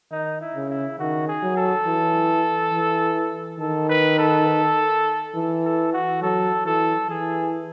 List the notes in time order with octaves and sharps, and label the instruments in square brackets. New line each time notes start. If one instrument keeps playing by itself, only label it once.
[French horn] D#3 [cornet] D#4
[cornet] E4
[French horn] C#3
[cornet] E4
[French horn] D#3 [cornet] F#4
[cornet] G#4
[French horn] F#3
[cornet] A4
[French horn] E3
E3
[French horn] D#3 [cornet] A4
[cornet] B4
A4
[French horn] E3
[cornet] A4
F#4
[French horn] F#3 [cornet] A4
[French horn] E3 [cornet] A4
[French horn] E3 [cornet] G#4